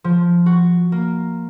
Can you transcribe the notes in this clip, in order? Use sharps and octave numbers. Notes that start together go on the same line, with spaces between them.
F3
F#4
A#3